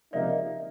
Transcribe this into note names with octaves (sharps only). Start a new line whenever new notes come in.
C#2 C3 F3 A#3 D#4 D5 E5